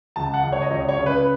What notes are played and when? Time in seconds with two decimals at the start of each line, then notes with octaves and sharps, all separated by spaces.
0.16 C#2 A5
0.34 F#5
0.43 C#2
0.52 C#5
0.62 D#5
0.71 C#2 C#5
0.89 C#5
0.98 C#3
1.06 B4